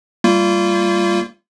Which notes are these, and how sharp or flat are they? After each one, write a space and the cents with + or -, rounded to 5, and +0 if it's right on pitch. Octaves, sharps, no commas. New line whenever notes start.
G3 +0 A#3 -30 F4 -20